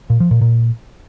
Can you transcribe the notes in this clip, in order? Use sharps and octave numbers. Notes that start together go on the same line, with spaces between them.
A#2
F3
A#2
A#2